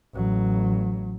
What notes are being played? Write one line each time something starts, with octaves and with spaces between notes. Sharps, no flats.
A1 F#3